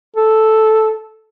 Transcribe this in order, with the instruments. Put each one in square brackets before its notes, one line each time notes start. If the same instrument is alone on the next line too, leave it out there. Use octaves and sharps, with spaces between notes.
[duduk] A4